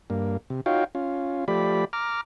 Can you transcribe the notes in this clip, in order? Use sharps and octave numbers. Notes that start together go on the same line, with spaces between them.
G2 A#3
C3
D#4 F4 F#4 C#5 F5 G5
C#4 F4
F3 A3 G4 D5 B5
A#5 D6 F6